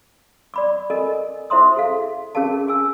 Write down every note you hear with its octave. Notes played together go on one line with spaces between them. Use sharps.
D5 B5 D6
A4 A#4 D#5 G#5
E4 C5 E5 A#5 C6 D#6
G#4 A4 F5
C#4 G#4 A#4 F5 A5
G#4 G#5 E6